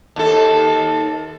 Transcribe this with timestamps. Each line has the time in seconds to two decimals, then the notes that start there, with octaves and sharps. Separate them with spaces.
0.16 D#2 A4